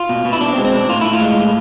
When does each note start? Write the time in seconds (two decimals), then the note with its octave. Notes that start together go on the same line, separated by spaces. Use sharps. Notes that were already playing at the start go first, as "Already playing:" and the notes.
Already playing: F4
0.09 B2
0.25 B2
0.33 E4
0.41 B2 D4
0.53 C4
0.58 G#3
0.65 C4
0.73 B2 D4
0.89 A2 F4
1.01 A2 E4
1.13 F4
1.21 G#3
1.37 A2